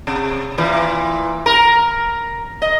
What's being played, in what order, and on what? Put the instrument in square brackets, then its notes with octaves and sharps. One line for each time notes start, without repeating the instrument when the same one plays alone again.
[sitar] C3
A#2 E3
A#4
D#5